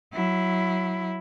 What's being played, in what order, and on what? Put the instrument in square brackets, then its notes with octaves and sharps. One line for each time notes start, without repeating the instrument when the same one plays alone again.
[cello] F#3 E4